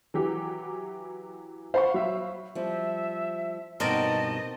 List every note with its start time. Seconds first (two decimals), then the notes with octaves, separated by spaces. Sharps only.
0.14 E3 F#3 G4
1.74 C5 F5 F#5 B5 C#6
1.94 F#3 E5
2.55 F3 G3 C4 E5
3.80 G2 B2 C4 D#4 A#4 D5 D#5 A5